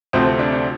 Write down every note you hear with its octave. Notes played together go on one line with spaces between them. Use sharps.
D2 C3 F3 A3 C4
C4
D4
D4